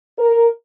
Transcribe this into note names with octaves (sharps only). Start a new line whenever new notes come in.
A#4